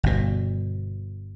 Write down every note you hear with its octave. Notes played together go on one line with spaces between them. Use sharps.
G1 B2